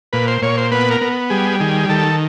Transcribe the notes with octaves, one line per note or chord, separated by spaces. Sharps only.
A#2 B4
C5
A#2 C#5
C5
B3 B4
A#4
B3
G3 G#4
D#3 G#4
D#3 A4